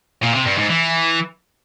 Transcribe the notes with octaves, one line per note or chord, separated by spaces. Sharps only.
A#2
C3
G2
G#2
E3